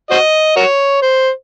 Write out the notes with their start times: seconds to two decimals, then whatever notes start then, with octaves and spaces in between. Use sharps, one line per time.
0.11 F#4 C5 D#5
0.56 F#4 A#4 C#5
1.02 C5